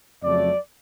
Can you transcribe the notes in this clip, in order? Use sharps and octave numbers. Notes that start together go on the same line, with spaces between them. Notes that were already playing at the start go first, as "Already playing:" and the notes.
F2 C#3 F#3 A3 D5